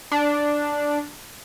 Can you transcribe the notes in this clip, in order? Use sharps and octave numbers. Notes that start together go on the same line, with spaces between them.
D4